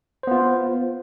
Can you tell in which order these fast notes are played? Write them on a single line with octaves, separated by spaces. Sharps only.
C5 B3 F4